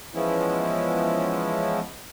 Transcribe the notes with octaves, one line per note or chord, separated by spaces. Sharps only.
E3 F3 G#3 B3 C#4 E4